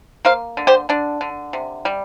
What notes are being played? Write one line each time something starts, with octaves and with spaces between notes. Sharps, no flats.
A#3 C5 F5
D3
G4 C5
D3 D4
D3
C3
G3